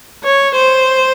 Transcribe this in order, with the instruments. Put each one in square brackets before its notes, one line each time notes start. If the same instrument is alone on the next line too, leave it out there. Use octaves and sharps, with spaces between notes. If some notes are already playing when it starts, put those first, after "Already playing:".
[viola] C#5
C5